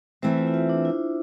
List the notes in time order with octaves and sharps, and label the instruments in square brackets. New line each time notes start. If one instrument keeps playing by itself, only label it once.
[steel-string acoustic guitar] E3 A3 C4 [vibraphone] C5 E5
[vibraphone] F4
E4
F4
D4
E4